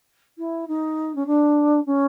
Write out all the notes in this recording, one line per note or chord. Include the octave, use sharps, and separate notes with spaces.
E4
D#4
C#4
D4
C#4